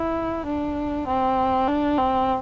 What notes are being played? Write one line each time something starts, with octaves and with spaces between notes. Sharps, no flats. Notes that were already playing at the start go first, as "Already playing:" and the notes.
Already playing: E4
D4
C4
D4
C4